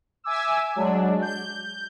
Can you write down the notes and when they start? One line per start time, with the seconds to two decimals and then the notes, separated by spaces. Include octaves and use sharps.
0.24 E5 G#5 D6 E6
0.76 F#3 G#3 D4
1.22 G6